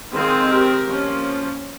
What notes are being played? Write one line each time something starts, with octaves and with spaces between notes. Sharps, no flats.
D#3 G#3 C4 F4 G#4
G4 A#4
F3 A#3 C#4